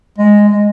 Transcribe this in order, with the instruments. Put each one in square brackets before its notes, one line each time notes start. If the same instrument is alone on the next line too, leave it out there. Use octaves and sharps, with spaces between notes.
[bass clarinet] G#3
G#3